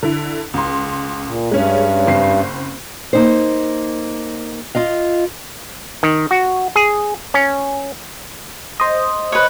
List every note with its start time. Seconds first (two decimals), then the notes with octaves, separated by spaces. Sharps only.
0.02 D3 E4
0.54 C#2 C6
1.26 A#2
1.51 G2 G#3 C#4
2.07 F#1 C4 C7
3.13 A#3 D#4 C5
4.75 F4 D#5 F5
6.03 D#3
6.31 F#4
6.76 G#4
7.34 C#4
8.80 C5 D#5
9.32 B4 C#5